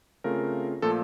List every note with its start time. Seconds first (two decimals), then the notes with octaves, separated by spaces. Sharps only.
0.24 C#3 A3 C4 F4 A#4
0.82 A#2 F3 A3 A4